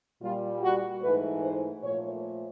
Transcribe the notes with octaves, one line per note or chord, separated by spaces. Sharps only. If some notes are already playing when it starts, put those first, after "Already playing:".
A#2 G3 F4
F#4
G#2 E3 A3 B4
C5
A#2 F3 A3 C#5